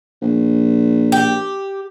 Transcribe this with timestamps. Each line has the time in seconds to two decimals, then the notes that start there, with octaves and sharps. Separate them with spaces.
0.22 A#1
1.12 G4